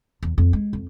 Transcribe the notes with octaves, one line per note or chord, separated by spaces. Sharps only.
E2
F2
G#3
F2